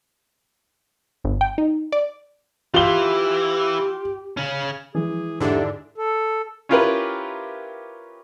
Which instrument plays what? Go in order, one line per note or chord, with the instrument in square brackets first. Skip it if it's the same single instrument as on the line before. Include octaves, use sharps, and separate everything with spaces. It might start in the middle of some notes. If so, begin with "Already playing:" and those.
[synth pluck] G1
G5
D#4
D5
[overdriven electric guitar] E3 [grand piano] F4 G7 [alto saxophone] G4
[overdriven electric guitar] C#3 C#4
[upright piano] E3 G#3 [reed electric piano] F3 [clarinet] G#4
[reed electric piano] E2 G4 E5 [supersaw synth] G#2 D3 D4 [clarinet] A4
[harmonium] A4
[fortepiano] C#4 E4 F4 G4 A#4 B4